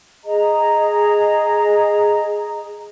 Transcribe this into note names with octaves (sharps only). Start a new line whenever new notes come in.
G#4 D#5 A#5